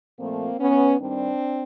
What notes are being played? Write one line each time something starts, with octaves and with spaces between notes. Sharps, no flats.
A#2 F3 A3 A#3 C4
B3 C#4
G2 D#3 G3 C4 D4